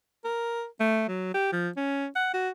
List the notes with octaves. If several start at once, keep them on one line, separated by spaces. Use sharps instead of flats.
A#4
A3
F#3
G4
F3
C#4
F#5
F#4